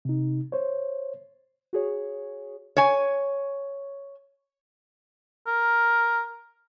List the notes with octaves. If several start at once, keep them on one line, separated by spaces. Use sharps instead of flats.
C3 D#4
C5 C#5
F#4 G#4 C#5
C#5 G#5
A#4